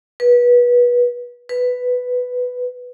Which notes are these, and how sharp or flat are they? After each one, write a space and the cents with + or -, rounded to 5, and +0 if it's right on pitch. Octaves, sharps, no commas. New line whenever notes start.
B4 -25
B4 +5